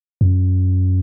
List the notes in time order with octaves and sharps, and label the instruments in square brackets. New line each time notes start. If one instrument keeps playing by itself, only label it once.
[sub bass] F#2